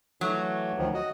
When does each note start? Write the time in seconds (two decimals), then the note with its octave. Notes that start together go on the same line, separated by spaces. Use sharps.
0.21 E3 F#3 A3
0.78 D2 D#3 F3
0.94 F#4 D#5